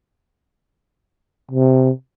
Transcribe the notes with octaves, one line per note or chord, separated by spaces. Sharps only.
C3